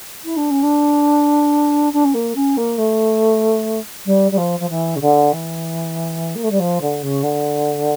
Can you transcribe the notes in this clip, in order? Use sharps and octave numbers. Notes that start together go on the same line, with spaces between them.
E4
D4
C#4
D4
D4
C#4
A#3
C#4
A#3
A3
G3
G3
F3
F3
E3
C#3
D3
E3
A#3
A3
G3
F3
D3
C#3
D3